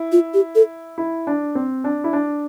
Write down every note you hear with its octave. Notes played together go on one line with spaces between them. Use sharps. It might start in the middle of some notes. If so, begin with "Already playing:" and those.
Already playing: E4
F4
G4
A4
E4
D4
C4
D4
E4
D4